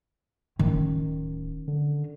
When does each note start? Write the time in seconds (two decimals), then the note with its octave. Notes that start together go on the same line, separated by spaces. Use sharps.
0.59 D1 D#3 C#4
1.68 D3